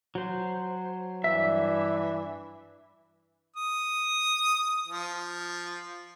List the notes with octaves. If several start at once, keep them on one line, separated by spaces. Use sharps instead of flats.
F#3 C5
G2 E3 D4 E5
D#6
F3